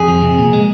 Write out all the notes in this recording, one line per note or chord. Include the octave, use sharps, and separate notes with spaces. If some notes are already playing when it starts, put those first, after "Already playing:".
Already playing: F2 G#4
F3
C3
A#2
G#3